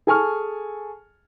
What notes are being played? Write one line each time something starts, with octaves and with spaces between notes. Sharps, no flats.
G#4 A4 G#5 A5 C#6 F6